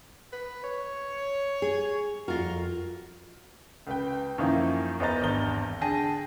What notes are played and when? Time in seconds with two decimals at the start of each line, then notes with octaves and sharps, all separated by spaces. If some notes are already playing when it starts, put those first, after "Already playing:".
0.33 B4
0.64 C#5
1.62 G#4
2.28 F2 F4 F#4 A#4
3.87 C#2 B4 G5
4.38 F#2 D#3 F3 A#3 D#4 E4
5.00 E2 B3 C5 D#5 A#5 A6
5.22 G#1 E2 G2 A#5 G7
5.81 D3 G#4 G5 A5 A#6 D#7